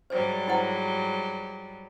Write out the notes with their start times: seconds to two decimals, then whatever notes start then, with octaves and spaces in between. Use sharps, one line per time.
0.10 G#2 F#3 G3 C5
0.48 E4 C5 F#5